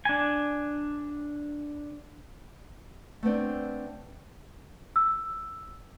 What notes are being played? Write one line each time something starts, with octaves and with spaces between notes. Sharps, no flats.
D4 G#5
A3 B3 C4 D4
E6